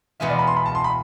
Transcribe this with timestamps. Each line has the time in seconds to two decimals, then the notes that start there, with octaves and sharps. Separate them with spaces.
0.20 E2 B2 G#3 B3 F4 E5
0.29 D5
0.39 B5
0.47 C6
0.57 B5
0.66 A5
0.75 C6
0.84 B5